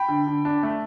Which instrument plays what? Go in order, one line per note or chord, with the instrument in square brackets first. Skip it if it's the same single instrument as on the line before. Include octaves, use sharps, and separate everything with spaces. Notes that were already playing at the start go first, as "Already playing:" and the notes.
Already playing: [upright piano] G5 B5
D3
D3
D4
A3